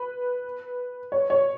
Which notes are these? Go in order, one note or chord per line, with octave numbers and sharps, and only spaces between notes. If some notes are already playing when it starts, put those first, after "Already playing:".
Already playing: B4
C#5
C#5